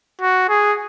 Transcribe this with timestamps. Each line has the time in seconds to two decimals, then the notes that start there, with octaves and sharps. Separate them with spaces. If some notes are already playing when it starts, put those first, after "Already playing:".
0.21 F#4
0.49 G#4